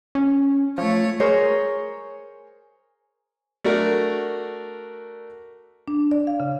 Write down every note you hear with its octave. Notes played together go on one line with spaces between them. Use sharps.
C#4
F3 A3 C#5
G#4 A#4 C5 C#5
A3 D4 F#4 A#4
D4
D5
F5
C#3